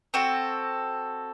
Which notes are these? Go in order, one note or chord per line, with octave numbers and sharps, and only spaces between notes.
C4 F#4 A4